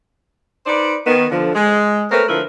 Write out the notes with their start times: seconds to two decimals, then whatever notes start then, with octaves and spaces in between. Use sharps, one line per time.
0.66 D#4 B4 C5 D5
1.07 D#3 B3
1.31 D3 F3
1.55 G#3
2.11 A3 C4 A#4 B4 C#5
2.29 D3 F3 E4 A#4 B4